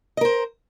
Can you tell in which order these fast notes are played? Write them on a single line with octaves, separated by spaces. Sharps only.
D#5 A#4 C5